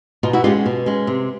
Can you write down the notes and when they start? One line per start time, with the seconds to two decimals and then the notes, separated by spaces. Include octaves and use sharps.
0.23 B2 D#4 F4
0.33 E4 F#4
0.44 G#3 C#4 F4 G4
0.66 B2
0.86 G#3 C#4
1.07 C3